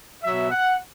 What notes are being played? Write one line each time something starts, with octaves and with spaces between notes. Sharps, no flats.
B2 F#3 E5
F#5